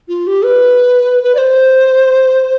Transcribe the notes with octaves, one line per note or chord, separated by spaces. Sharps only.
F4
G4
B4
B4
D5
C5